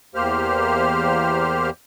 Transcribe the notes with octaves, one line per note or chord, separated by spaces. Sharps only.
E2 A#3 G4 C5 F6